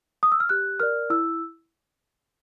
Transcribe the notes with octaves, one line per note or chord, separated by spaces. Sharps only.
D#6
E6
F6
G4 F#6
A#4 D5 F6
E4 E6